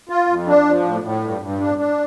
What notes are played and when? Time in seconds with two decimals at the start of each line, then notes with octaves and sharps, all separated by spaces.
0.09 F4
0.27 F2
0.47 D4
0.65 F3
0.84 A2
1.02 A2
1.22 G2
1.41 G2
1.60 D4
1.78 D4